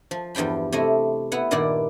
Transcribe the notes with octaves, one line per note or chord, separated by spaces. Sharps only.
F3
E2 G2 F3 G5 B5
C3 A3 E4 D#5
B3 E4 F#5
G2 A#2 D#3 E4 D5 F#5